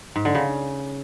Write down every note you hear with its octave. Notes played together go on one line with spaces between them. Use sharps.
G#2
D3
C#3